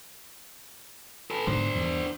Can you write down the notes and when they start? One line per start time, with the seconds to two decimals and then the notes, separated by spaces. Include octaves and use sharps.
1.31 A4 B4
1.47 G#2 B2 D3 D4 C5
1.75 E2 G2